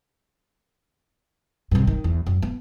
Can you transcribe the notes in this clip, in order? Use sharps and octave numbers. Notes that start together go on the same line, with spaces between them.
G2 C3
D#3
E2
F#2
B3